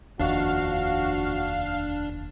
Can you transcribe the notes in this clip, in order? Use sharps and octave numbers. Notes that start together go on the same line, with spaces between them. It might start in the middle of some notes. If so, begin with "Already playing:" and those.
F1 D#2 F3 D4 F#4 F5